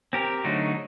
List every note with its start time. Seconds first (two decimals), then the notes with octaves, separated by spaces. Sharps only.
0.13 C4 G4 A#4
0.44 D3 F#3 A3 D#4 F#4